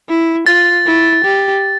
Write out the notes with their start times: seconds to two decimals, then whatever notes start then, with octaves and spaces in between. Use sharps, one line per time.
0.09 E4
0.46 F4 A6
0.86 E4
1.24 G4